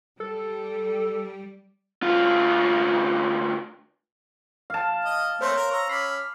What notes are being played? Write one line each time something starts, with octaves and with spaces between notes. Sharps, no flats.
G3 A4
D2 F4
F5 A5
D#5
A3 A#3 C4 C5 C#5 C6
A#4
A#5 C#6 E6
C#4 B5 D6 F6 C7